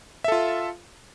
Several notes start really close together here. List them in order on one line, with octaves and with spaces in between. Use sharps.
E5 A4 F4